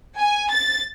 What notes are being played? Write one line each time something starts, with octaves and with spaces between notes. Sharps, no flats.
G#5
A6